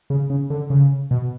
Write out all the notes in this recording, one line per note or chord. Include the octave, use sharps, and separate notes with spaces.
C#3
C#3
D3
C#3
B2